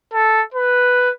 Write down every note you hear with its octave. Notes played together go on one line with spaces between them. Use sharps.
A4
B4